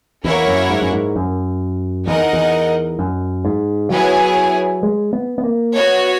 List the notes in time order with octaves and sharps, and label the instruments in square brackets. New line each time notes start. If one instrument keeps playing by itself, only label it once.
[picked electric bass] E2 [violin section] A#3 E4 A#4 C#5 F#5
[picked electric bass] F#2
G#2
F#2
G#2
F#2
[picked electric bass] E2 [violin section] D#4 A#4 D#5 F#5
[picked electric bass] E2
F#2
G#2
[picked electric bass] F#3 [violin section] B3 E4 G#4 C#5 G#5
[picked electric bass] G#3
B3
B3
A#3
[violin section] B3 F#4 C#5